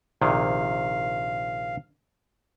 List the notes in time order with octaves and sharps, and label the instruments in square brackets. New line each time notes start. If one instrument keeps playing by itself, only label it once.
[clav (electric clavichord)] A#1 C3 D#3 [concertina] F5